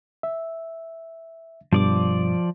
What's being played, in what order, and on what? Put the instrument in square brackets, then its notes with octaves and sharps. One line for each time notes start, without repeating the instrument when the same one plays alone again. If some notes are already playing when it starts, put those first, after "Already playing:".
[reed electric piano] E5
[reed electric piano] G2 B2 [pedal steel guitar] F3 D5 D6